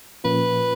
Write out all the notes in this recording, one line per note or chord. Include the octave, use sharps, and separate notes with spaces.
A#2 F3 A#3 C#4 F4 B4